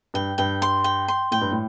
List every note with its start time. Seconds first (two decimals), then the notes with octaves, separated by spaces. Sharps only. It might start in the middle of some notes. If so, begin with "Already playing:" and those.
0.14 G2 G5
0.38 G2 G5
0.62 C6
0.84 G5
1.08 C6
1.32 A2 G5
1.41 G2
1.52 A2